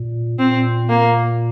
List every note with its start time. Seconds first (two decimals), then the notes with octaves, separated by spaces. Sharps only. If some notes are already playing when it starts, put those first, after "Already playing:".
Already playing: A#2
0.39 A#2 C4
0.89 A#3